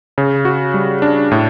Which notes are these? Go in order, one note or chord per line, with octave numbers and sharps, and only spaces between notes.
C#3
F#4
G3
D4
A2